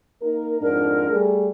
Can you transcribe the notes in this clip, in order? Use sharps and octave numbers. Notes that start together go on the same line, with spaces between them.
A#3 D#4 A#4
F2 G#2 D4 A#4
G3 A3 G#4